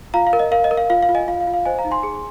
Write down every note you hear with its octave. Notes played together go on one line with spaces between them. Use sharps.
F4 F5 A#5
F5
A#4
D#5
A#4 F5
D#5
A#4
F5
F4 F5
F5
F4
D#5 G#5
F4 F5
F5
F4
F5
C5 D#5 G#5
F5 A#5
D#4
G#5 C6
G#4